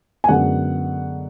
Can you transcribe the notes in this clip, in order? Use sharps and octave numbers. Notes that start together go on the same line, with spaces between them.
G#5
F#2 D3 G#3 B3 F#5